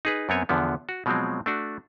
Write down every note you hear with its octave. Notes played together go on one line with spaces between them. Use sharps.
D#4 G#4 B4
F#2 B3 C4 C#5 G#5
E2 D3 F3 B3
F#4
B2 F3 F#3 G#3 C4
A3 D4 F#4